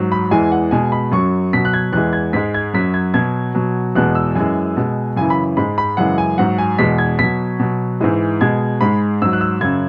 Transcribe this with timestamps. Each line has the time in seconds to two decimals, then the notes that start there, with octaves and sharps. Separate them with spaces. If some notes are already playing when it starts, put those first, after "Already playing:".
Already playing: G#2 F#3
0.12 B5
0.31 E2 E3 G#3 G#5
0.52 F#5
0.71 B2 G#3 G#5
0.92 B5
1.12 F#2 F#3 C#6
1.53 B2 F#3 B6
1.65 F#6
1.73 G#6
1.93 E2 E3 G#3 F#6
2.13 G#6
2.33 G#2 G#3 B6
2.54 G#6
2.74 F#2 F#3 B6
2.94 G#6
3.14 B2 F#3 G#6
3.55 B2 F#3
3.95 E2 B2 G#3 F#6
4.15 E6
4.35 F#2 E3 G#3 G#5
4.77 B2 G#3
5.16 F#2 C#3 E3 G#5
5.30 B5
5.57 G#2 G#3 B5
5.78 B5
5.97 F#2 C#3 E3 G#3 F#5
6.18 G#5
6.38 G#2 F#3 F#5
6.58 G#5
6.79 E2 B2 G#3 B6
6.98 G#6
7.19 B2 F#3 B6
7.60 B2 F#3
8.00 G#2 E3 G#3
8.41 B2 G#3 G#6
8.81 G#2 G#3 B5
9.22 G#2 F#3 E6
9.33 F#6
9.41 E6
9.61 F#2 C#3 F#3 G#6